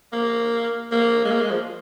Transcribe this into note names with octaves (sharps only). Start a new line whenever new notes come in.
A#3
A#3
G#3
A#3
G#3
F3